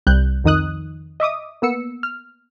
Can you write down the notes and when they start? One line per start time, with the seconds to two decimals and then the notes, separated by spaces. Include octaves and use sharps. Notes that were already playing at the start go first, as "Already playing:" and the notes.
0.07 C2 G3 F#6 G6
0.44 F2 D#3 D#4 D#6 F#6
1.20 D#5 E5 D6 D#6
1.62 A#3 B3 E6 C#7
2.03 F6